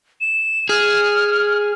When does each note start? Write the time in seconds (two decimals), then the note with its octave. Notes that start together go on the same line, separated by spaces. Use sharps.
0.21 E7
0.69 G#4 F6